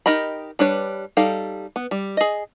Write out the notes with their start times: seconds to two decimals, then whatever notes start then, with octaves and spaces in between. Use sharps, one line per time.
0.06 D#4 G4 A#4 D#5 B5
0.59 G3 D4 B4 C#5
1.17 G3 D#4 A4 F5 G5
1.76 B3
1.91 G3
2.17 G#4 D#5